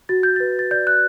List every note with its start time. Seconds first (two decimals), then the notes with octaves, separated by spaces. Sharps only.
0.09 F#4 A6
0.23 G6
0.36 B4 A6
0.59 A6
0.71 D5 G6
0.87 F#6